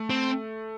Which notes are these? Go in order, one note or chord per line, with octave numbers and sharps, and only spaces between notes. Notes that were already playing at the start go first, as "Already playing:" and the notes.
Already playing: A3
C4